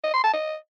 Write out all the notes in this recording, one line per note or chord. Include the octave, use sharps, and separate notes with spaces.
D#5
C6
A5
D#5